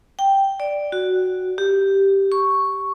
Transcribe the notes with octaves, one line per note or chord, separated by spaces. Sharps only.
G5
D5
F#4
G4
C#6